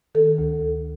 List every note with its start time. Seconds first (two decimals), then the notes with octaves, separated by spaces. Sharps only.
0.15 D#3 A4
0.38 D2
0.61 D2